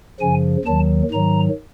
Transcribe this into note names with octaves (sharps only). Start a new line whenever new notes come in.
F#2 C#3 F3 G#5
D#2 D#3 F#3 A5
G#2 D#3 F#3 A#5